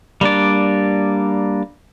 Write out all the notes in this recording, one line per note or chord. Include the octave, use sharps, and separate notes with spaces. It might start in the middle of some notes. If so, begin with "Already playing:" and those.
G3 A#3 D4 D5